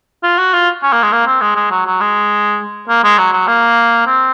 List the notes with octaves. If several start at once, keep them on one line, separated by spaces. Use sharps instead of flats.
F4
F#4
F4
C#4
A#3
G#3
A#3
C4
G#3
G#3
F#3
F#3
G#3
A#3
G#3
F#3
F#3
A#3
C4